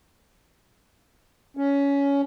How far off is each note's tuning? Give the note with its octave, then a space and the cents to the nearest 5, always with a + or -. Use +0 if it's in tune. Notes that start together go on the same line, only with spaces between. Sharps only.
C#4 +15